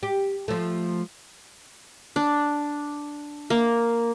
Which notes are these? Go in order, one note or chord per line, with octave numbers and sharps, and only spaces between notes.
G4
F3 A3
D4
A#3